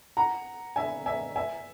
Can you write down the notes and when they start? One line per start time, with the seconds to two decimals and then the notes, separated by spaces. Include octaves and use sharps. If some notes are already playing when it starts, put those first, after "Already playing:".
0.17 F#5 A#5
0.76 E5 G#5
1.06 E5 G#5
1.36 E5 G#5